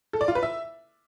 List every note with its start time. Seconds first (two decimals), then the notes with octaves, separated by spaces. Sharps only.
0.13 A4
0.21 D5
0.28 F4
0.35 B4
0.43 E5